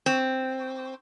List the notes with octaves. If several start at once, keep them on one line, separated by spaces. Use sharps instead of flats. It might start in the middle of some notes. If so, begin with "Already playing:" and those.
C4